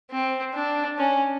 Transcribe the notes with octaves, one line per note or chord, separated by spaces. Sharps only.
C4
D4
C#4